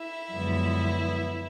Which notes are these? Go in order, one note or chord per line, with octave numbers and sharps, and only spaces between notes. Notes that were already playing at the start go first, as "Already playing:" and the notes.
Already playing: E4 E5
F#2 D3 F3 G#3 B3